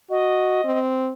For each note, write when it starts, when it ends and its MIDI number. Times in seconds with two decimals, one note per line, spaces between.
0.10 0.64 66
0.10 0.79 75
0.65 1.11 60